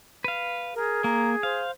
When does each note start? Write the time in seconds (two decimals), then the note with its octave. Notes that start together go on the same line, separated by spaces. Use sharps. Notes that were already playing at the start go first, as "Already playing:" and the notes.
0.24 B4 F5
0.75 G#4 A#4
1.04 A#3 A#5
1.43 C5 F5